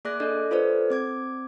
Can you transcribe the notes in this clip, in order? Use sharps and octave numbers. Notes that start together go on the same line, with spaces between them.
A#3 G#4 D5 D6 F#6 A#6
D4 A4 D5 D#5
F4 A4 B4 C5 D5
C4 D6 G#6